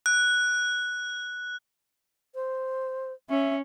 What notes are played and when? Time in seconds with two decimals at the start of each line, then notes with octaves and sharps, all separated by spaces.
0.06 F#6
2.35 C5
3.30 C#4 E5